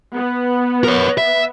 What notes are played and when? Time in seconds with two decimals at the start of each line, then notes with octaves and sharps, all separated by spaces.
0.15 B3
0.84 A#4 C#5
1.18 E5